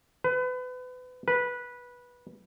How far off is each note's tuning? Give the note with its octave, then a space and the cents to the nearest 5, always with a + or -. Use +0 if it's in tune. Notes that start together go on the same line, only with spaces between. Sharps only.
B4 +30
B4 -15